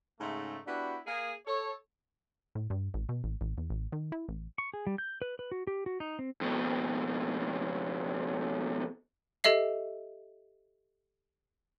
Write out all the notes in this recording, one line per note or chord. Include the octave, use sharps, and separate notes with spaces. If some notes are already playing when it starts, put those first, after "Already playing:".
G#2 C#3 A3
B3 D4 E4 F#4 G4
A#3 G#4
A4 C#5
A2
G2
A1
B2
A1
A1
E2
A1
D#3
E4
A1
C#6
G#4
G3
G6
B4
B4
F#4
G4
F#4
D#4
C4
F2 B2
G4 A4 D#5 E5 C7